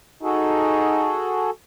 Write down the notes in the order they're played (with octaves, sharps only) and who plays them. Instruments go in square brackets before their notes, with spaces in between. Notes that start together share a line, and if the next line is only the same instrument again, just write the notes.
[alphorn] D#4 [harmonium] F#4 G#4 A4